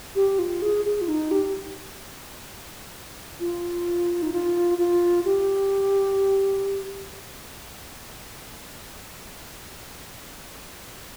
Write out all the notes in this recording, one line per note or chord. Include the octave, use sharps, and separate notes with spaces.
G4
F4
G#4
G#4
F4
D#4
G4
F4
D#4
F4
F4
G4